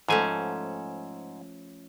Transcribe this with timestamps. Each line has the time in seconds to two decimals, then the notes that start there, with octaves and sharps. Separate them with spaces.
0.08 G#2 F3 A3 C#4 G#5